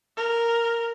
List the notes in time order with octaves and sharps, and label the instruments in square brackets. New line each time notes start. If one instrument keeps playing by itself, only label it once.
[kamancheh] A#4